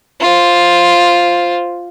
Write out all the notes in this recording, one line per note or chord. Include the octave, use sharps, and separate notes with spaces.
F4 C5